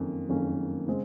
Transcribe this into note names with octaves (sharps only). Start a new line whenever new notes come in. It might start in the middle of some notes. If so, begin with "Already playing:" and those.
Already playing: F#1 F2 D#3 A#3 C#4
F#1 F2 D#3 A#3 C#4
C#3 G#3 C4